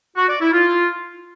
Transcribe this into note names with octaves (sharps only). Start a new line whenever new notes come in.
F#4
D5
E4
F4